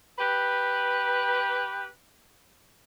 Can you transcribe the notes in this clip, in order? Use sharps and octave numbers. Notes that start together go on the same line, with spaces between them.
G4 B4